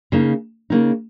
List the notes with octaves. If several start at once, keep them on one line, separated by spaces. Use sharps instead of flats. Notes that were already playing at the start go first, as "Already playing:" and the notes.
C#3 A#3 D#4
C#3 A#3 D#4